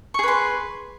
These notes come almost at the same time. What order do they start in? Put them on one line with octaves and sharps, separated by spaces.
C#6 G#4 B4 C6